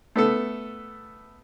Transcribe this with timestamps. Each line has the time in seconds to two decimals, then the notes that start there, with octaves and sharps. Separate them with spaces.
0.16 A3 B3 A4